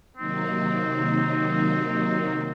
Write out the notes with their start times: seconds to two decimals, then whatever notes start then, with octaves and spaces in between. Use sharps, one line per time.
0.17 C3 D#3 F#3 A#3 C4 D#4